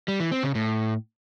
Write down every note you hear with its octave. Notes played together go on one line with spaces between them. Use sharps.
G3
E3
C4
C#3
A2